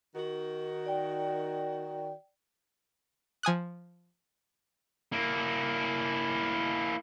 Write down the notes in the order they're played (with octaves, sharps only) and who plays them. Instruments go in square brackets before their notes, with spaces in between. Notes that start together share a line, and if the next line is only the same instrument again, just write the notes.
[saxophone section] D#3 F#4
[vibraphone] D5 G5
[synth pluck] F3 G#5 D#6 F#6
[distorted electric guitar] A#3 E4